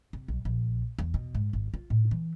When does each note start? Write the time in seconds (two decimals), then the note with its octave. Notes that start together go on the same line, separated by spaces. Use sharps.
0.13 C3
0.28 B1
0.45 A#1
0.98 E2
1.14 B2
1.35 G#2
1.53 G#1
1.74 F4
1.90 A2
2.11 E3